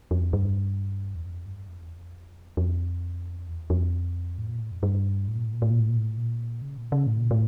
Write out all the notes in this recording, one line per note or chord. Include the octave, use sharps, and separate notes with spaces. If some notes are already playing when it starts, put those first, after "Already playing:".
F2
G2
E2
F2
G2
F2
E2
F2
F2
E2
F2
A2
A#2
A2
F2
G2
A2
A#2
A2
A#2
A2
A#2
A2
A#2
A2
A#2
C#3
A#2
C#3
A2
A#2
A2